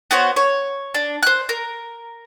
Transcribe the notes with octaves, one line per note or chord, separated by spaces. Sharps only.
B3 F#4 C5 C#5
C#5
D4
C5 F#6
A#4